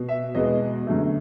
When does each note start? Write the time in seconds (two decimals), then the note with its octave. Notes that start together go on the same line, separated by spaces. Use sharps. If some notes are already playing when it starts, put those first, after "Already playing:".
Already playing: B2
0.09 E5
0.35 E2 B2 G#3 B3 D#5
0.87 F#2 D3 F#3 A3